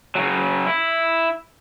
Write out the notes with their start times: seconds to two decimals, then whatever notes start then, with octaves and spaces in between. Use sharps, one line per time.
0.15 C#3 F#3
0.66 E4